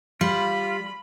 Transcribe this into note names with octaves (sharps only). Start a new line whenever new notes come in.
G3 F4 B5